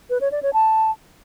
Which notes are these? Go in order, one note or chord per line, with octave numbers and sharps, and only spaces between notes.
B4
C#5
D5
C#5
A5